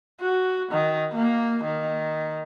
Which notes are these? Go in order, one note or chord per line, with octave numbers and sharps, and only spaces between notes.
F#4
D#3
A#3
D#3